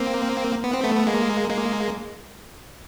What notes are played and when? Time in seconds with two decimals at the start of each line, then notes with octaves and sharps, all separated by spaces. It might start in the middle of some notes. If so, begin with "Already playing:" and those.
Already playing: A#3 C4
0.64 B3
0.74 C4
0.84 A3 B3
0.95 B3
1.07 G#3 A#3
1.50 G#3 A#3